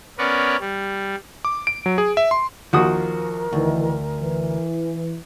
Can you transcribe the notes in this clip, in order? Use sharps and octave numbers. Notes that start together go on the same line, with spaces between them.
B3 C#4 A#4 B4 C#5 D5
G3
D6
D7
F#3
G#4
E5
C6
D#2 F3 F#4 A#4 D#6
D2 D#3 E3
E3